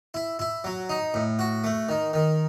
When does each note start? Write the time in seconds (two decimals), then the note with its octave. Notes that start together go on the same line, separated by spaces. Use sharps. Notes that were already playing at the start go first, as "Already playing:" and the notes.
0.14 E4
0.39 E4
0.64 F#3
0.89 D#4
1.14 A2
1.39 F#4
1.64 A3
1.89 D#3
2.13 D#3